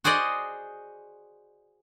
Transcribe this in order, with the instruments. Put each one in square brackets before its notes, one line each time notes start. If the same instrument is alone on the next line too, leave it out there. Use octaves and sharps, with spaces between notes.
[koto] F#4 G#4 C5 D5 D#5